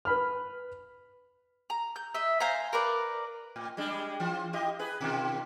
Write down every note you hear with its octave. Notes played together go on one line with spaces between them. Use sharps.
B4 B5 F6
A#5
G6
D#5 E5
C5 F5 G#5 A#5
A#4 B4 D5
A2
G3 G#3 D4
E3 F4
E4 G4 D#5
G#4 B4
B2 D#3 F4